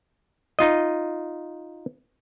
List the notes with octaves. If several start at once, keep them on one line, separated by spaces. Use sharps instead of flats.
D#4 F4 D#5